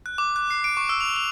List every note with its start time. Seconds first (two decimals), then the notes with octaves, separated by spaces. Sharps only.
0.06 F#6
0.18 D6
0.36 F#6
0.51 C7
0.64 D7
0.77 C#6
0.89 E6
1.00 F7
1.16 F7